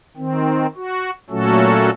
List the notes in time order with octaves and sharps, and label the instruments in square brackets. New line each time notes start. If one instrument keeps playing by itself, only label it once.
[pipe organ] D#3 C4
F#4
A#2 F#3 A3 C#4 F#4 A4